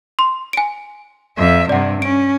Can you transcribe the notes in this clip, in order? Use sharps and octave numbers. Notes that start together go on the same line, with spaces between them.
C6
G#5 D7
F2 E5
G2 C3 D5 F#5
C#4 D7